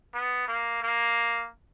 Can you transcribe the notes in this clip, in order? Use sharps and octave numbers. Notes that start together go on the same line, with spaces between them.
B3
A#3
A#3